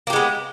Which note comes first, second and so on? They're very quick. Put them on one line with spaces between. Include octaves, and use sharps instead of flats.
A#3 G4 G#3 B3